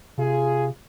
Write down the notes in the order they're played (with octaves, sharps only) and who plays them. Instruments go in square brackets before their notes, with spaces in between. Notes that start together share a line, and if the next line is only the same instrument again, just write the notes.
[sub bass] C3 [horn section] F4 G#4